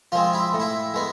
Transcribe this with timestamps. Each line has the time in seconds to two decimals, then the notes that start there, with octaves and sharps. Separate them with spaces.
0.12 F3 G#3 C4 F4
0.33 E4
0.53 A2
0.60 E4
0.94 G#3 B3